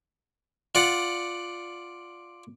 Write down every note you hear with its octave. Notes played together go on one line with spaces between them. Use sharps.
F4 D5 F#5